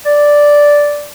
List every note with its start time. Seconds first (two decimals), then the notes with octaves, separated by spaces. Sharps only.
0.05 D5